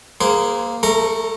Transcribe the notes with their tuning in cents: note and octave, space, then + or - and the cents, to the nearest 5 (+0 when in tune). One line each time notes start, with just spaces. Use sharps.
A#3 +0 G#4 +0 C5 -35
A3 +0 A#4 -45 A#5 +0